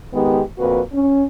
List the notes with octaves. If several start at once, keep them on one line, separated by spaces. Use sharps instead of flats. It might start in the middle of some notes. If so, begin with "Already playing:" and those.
D#3 G#3 B3 G4
F2 A#2 F#4 B4
C#4